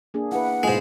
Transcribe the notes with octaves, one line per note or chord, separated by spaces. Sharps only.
A#3 D4 G#4
E4 B4 F#5
G#2 B2 G#3 F4